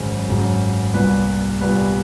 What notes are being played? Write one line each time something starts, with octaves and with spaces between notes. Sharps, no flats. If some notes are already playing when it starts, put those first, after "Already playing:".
Already playing: G#1 F#2 C#3 F#3 C5
G#1 F#2 C#3 F#3
C2 A#2 G3 B3 B4
C2 A#2 G3 B3 B4